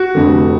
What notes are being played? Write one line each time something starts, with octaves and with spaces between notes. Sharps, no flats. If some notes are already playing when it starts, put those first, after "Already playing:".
Already playing: F#4
F1 F2 D3